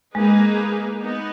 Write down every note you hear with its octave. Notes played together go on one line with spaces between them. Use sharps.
G#3 A#3 D#4 G#4 B4
B3 D#4